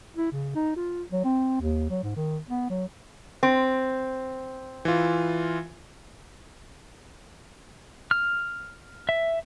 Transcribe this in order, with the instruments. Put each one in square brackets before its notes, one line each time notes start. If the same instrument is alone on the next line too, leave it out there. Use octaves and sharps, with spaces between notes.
[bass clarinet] E4
C#3
D#4
F4
F#3
C4
D#2
F#3
G#2
D#3
B3
F#3
[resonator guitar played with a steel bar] C4
[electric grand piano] E3 F4
[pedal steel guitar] F6
E5